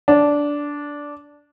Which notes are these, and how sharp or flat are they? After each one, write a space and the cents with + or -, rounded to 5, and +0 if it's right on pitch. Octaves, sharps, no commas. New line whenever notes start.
D4 -10